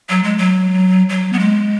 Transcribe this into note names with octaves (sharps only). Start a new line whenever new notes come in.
F#3
G#3
F#3
F#3
B3
G#3